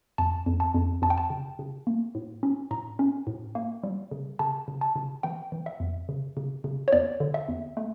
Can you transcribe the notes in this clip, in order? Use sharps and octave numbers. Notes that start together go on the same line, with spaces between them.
F2 A5
F2
A5
F2
F2 A5
G5
A5
C#3
C#3
A#3
A2
C#4
A2 A#5
C#4
A2
A#3
G3
C#3
C#3 A5
C#3
A5
C#3
E3 G5
E3
E5
F2
C#3
C#3
C#3
C#5
E2 D5
D3
E5
E2
A3